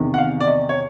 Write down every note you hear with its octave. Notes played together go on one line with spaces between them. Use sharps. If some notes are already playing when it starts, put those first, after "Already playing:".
Already playing: E2 C3 D#3
F#5
F5
D5
D#5
C#5